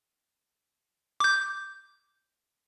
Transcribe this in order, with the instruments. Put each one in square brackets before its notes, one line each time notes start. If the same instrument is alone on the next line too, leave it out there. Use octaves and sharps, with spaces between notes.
[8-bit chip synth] D6 G6